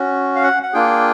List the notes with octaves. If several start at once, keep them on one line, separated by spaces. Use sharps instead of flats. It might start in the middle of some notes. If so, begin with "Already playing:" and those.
Already playing: C#4 F#4
F5
F#5
F#5
A#3 D4 F4 G#4 G5